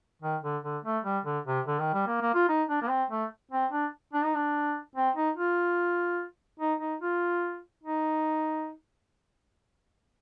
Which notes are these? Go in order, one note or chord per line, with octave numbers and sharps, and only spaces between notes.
D#3
D3
D3
A3
G3
D3
C3
D3
D#3
G3
A#3
A#3
F4
D#4
D4
A#3
C4
A3
C4
D4
D4
D#4
D4
C4
D#4
F4
D#4
D#4
F4
D#4